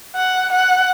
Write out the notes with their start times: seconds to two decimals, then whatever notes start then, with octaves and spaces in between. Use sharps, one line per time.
0.16 F#5
0.52 F#5